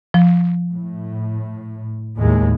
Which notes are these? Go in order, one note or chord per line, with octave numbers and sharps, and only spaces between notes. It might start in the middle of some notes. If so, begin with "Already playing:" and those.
F3
A2
D#2 A2 G#3